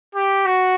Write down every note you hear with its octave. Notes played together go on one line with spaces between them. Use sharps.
G4
F#4